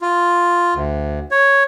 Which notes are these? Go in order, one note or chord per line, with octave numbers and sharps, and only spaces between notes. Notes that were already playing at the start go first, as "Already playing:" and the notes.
F4
D2
C#5